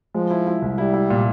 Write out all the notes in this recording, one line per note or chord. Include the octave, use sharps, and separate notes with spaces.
F3 G#3
E4
E4
C2
G3 E4
E4
A#2